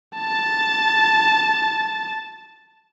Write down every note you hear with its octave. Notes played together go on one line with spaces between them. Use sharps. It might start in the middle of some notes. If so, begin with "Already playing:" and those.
A5 A6